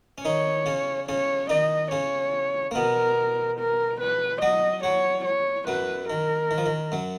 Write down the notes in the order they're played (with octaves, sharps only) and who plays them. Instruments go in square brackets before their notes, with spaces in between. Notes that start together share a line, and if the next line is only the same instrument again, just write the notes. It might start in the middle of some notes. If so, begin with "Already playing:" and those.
[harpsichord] C#4
[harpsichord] D#3 D#4 [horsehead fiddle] C#5
[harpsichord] C#3 C#4
[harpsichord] C#3 C#4 [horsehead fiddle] C#5
[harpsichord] D#3 D#4 [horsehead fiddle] D#5
[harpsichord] C#3 C#4 [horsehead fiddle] C#5
[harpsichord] A#3
[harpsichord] B2 B3 [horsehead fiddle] A#4
[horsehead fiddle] A#4
B4
[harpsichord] F#3 F#4 [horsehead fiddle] D#5
[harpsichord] F#3 F#4 [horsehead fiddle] C#5
[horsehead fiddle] C#5
[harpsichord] F#2 F#3 [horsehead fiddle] B4
[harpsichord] D#3 [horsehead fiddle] A#4
[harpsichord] D#3
F3
D#3
F#2 F#3